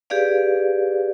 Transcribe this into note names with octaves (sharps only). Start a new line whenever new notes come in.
G4 G#4 B4 D5 F5